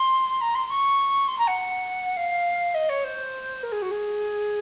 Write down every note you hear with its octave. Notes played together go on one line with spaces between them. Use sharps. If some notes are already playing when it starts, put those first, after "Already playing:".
Already playing: C6
A#5
C6
C#6
C6
A#5
F#5
F5
D#5
C#5
C5
A#4
G#4
F#4
G#4